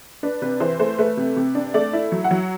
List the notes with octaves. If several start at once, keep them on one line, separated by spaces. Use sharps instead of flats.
D4 B4
C3 B4
E3 C5
A3 C5
A3 B4
C3
C3
D4
A3 D5
E4
F#3
F#5
F#3